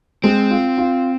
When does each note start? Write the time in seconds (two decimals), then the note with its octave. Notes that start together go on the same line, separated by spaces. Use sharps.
0.24 G#3 C4
0.51 F4
0.78 F4